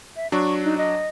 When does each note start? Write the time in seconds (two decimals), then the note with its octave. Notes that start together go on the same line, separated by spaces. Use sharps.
0.16 E5
0.32 F#3 D4 C#6
0.64 D#4
0.77 D#5